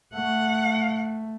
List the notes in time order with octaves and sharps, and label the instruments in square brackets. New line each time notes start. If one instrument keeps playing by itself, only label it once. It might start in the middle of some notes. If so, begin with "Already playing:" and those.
[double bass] A3 [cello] F#5